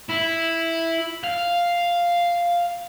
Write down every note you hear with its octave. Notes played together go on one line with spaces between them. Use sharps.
E4
F5